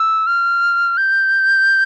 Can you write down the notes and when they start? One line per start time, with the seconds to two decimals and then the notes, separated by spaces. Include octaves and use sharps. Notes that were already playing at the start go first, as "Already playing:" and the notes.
Already playing: E6
0.27 F6
0.97 G6